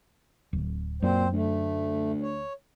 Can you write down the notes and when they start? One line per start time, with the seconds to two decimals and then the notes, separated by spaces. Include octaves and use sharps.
0.53 D1
1.02 F#2 A#2 C4 C5
1.33 D2 A3
2.21 C#5